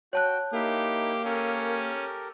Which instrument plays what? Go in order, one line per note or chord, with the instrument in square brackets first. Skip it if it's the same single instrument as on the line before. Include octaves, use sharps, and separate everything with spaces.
[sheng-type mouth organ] F#4 G5 [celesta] C#5 A5 F#6
[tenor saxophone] A#3 [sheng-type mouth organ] D#4 E4 [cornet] G4
[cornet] C#4 [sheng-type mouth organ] G4 A4 A#4